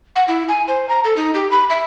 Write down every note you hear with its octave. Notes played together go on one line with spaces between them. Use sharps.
F#5
E4
G#5
C5
A#5
A4
D#4
G4
B5
E5